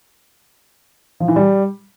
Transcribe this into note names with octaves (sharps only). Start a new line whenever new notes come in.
F3
E3
G3